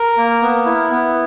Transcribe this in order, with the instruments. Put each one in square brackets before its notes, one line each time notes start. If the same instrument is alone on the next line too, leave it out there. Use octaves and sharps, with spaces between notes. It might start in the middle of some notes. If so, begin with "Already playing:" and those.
Already playing: [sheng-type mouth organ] A#4
A#3
B3
E4
B3